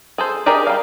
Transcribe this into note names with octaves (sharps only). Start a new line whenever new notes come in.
G#4 A4 C5
G4 G#4 A#4 D5 D#5
G3 F5